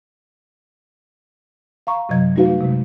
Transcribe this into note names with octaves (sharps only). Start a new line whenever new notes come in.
F5 A#5 C#6
F#2 C3 F#3 D#5 G#6
G3 A3 D#4 F#4 B4 F5
C3 G#3